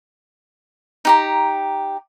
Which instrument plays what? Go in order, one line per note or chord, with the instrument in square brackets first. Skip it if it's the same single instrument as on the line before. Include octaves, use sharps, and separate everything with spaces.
[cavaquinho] D#4 G4 A#5